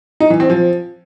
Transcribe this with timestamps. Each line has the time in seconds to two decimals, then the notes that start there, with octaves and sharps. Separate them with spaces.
0.20 D#4
0.30 E3
0.40 C4
0.50 F3